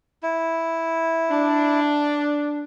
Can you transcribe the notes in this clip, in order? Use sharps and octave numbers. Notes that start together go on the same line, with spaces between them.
E4
D4